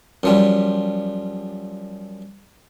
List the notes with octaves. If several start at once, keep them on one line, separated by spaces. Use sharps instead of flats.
F#2 F3 G3